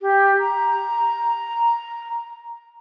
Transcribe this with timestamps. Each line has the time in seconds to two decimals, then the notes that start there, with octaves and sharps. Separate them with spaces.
0.01 G4
0.40 A#5